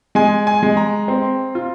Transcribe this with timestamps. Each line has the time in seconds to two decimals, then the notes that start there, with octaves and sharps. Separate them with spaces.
0.15 G#3 G#5
0.47 G#5
0.63 G#3
0.77 A#5
1.08 C4
1.55 F4